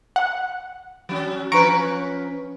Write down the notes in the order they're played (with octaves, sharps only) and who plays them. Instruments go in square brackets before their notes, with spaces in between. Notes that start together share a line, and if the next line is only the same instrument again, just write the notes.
[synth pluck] F#5
[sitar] F#3 C#4
[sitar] F3 C#4 B4 [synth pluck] A#5 C#6 D7